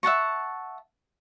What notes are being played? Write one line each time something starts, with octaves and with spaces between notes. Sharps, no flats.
E5 F#5 A5 C#6